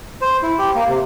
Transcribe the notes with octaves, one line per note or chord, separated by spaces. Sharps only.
C5
E4
G4
A#3
C3